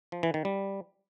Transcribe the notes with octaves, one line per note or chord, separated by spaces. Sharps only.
F3
E3
D#3
G3